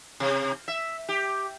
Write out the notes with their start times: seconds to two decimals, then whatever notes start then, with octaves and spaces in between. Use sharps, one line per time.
0.20 C3
0.68 E5
1.09 G4